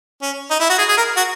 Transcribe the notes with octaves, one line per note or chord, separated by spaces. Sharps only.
C#4
D#4
E4
F#4
G#4
G#4
A#4
F#4